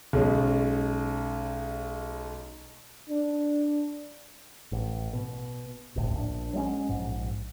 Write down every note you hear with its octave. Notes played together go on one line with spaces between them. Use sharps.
B1 G#3 C#4
D4
A1
B2
D1 G1 C#2 A2
A#1 D4
F#3 G#3 C#4
A#1 G#2